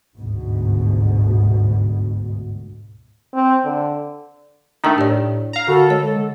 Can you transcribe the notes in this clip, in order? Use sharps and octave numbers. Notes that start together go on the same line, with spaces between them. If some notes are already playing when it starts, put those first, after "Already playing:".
G1 D2 G#2 B2
C4
D3
D#3 A3 D4 A#5
A2 G4 D5
F5 A#5
D3 F#4 A4
G#3 C#5
D3